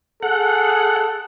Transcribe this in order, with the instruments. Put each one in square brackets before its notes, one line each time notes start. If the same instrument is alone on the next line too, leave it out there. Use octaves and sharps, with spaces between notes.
[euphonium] G#4 [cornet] A4 [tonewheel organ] F#5